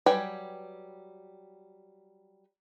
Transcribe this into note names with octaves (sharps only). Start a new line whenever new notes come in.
F#3 G3 B4 G5 G#5